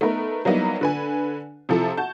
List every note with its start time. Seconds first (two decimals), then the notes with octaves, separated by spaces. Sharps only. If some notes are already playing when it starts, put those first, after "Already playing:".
0.01 A3 B3 D#4 A#4 B4
0.45 F#3 G3 A#3 B3 D#4 E4
0.81 D3 B4 G#5
1.69 C3 F3 E4 A4
1.97 F#4 A5 G6